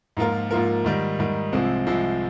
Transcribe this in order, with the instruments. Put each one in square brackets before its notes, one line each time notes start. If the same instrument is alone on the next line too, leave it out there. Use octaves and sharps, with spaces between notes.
[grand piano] G#2 F3 A#3 F4 A#4
G#2 F3 A#3 F4 A#4
G#2 D#3 G3
G#2 D#3 G3
C2 C3 F3 G#3 C4
C2 C3 F3 G#3 C4